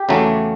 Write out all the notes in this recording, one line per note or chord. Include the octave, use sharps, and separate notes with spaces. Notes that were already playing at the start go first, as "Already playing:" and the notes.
Already playing: G4
E2 C#3 F#3 A3